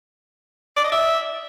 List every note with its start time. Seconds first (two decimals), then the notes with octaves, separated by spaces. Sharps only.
0.77 D5
0.84 D#5
0.92 E5